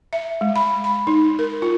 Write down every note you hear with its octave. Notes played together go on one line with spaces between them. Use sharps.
E5
G#3
B5
B5
D#4
A#4
F4